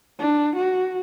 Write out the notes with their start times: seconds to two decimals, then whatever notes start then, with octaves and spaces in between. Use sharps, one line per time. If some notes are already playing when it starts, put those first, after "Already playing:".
0.19 D4
0.56 F#4